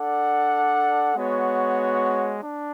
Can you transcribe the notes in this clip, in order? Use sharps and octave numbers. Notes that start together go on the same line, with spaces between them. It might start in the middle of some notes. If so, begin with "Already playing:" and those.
Already playing: D4 A4 D5 F#5
G#3 B3 F#4 C#5 F#5
D4